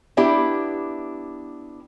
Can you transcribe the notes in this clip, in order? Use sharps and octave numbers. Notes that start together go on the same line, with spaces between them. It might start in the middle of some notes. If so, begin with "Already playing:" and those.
B3 D4 E4 G4